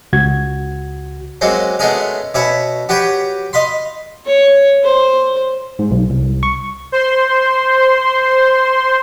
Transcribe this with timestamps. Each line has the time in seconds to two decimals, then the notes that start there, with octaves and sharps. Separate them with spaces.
0.13 C#2 F#4 G#6
1.41 F#3 G#3 A#3 C4 C#4
1.79 G#3 A3 B3 C#4 G#4 A#4
2.34 B2 C#4 C#5 E5 B5
2.89 F#4 G4 B4 C#5 G5
3.53 D#5 F5 B5 C6
4.26 C#5
4.84 C5
5.79 G#2
5.91 B1
6.10 C2
6.43 C#6
6.92 C5 C6